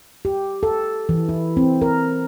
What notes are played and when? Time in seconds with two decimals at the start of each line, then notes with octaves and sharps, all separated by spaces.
0.25 G4
0.63 A4
1.09 E3
1.29 E4
1.57 C4
1.82 A#4